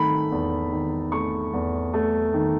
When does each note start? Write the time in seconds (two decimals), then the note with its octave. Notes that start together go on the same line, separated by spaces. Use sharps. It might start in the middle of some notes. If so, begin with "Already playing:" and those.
Already playing: D#3 A3 B5
0.31 E2
0.72 D#3
1.12 A3 C#6
1.53 E2
1.94 A3
2.34 D#3